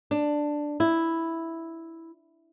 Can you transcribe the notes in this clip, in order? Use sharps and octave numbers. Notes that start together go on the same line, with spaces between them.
D4
E4